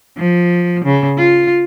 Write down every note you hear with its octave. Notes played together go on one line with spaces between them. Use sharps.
F3
C#3
F4